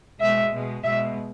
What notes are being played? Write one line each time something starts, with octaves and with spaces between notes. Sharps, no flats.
B2 G#3 E5
B2 G#3
B2 G#3 E5